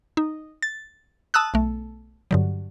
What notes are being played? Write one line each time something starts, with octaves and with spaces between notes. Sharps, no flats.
D#4
A6
A5 D#6 E6 F#6
B1 A3
G2 D3 F#3